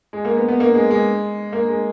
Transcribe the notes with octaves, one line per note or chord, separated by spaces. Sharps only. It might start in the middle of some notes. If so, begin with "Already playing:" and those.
G#3
A#3
B3
B3
A#3
G#3
G#3
A#3
G#3